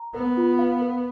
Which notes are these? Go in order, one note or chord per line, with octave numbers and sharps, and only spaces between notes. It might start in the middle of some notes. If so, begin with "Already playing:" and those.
Already playing: A#5
B3 A#4
F4
F5
A#4